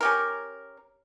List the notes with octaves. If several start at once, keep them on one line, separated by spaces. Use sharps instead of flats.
C#4 G4 A#4